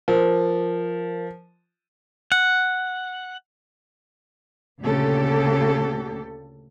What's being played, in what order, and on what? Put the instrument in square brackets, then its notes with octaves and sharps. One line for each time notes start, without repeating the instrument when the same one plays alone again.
[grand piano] F3 [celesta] A#4
[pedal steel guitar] F#5
[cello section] D2 A#2 C#3 G4 A4